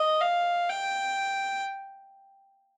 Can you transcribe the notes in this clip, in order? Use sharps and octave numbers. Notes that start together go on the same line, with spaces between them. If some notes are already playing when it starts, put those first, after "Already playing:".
Already playing: D#5
F5
G5